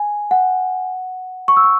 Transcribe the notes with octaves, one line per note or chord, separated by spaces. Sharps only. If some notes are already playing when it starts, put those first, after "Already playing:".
Already playing: G#5
F#5
C#6
E6
C#6